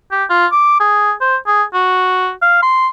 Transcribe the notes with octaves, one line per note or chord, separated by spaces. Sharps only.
G4
F4
D6
G#4
C5
G#4
F#4
F5
C6